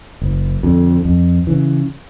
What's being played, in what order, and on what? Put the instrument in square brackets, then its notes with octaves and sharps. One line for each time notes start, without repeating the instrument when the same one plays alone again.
[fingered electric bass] F#1
F2 D3
F2
C#3 E3